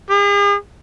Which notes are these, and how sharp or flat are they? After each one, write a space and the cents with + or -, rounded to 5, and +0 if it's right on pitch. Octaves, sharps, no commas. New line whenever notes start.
G#4 -45